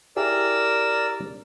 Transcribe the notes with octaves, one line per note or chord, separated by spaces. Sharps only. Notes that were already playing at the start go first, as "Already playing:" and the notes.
E4 G4 G#4 A#4 D5 E6